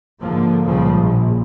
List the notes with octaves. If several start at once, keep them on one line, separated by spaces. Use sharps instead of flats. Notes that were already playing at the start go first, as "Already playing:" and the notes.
G#2 D3 F3 A#3
C#2 A#2 C#3 F3 G3
A#1